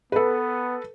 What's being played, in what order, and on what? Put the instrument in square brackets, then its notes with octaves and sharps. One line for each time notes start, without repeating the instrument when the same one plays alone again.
[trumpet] B3 [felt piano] A4 B4